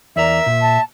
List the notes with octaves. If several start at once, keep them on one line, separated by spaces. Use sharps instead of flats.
E2 A#4 D5 E5 A#5
A#2
A5